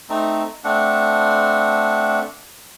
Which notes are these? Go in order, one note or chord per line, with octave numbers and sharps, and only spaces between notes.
A3 C4 D#4
A3 C4 D4 F#5